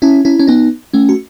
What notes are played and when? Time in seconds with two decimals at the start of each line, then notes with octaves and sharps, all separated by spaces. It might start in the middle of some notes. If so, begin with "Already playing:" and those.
0.02 C#4 E4
0.25 C#4 E4
0.39 C#4
0.47 B3 D#4
0.94 A3 C#4
1.09 F#4